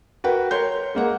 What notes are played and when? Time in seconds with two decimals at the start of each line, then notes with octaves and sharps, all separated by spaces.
0.24 F#4 A#4 B4 G5
0.51 A#4 C#5 C6 G6
0.95 G#3 A#3 F#5